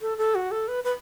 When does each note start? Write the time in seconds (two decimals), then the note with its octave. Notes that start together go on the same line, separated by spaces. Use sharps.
0.01 A4
0.18 A4
0.35 F#4
0.51 A4
0.68 B4
0.84 B4